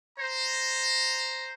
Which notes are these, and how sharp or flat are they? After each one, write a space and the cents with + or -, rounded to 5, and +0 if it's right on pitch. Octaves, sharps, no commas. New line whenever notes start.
C5 +0 A#5 +0